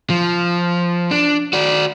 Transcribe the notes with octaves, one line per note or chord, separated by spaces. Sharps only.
F3
D4
F#4 D5